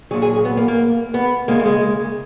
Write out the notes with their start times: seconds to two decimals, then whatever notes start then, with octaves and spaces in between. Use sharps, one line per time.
0.11 A#2 F#3 G#4
0.22 G#4
0.45 B3
0.57 A#3
0.68 A#3
1.14 B3
1.48 C#3 G#3 A#3
1.59 A#3
1.66 G#3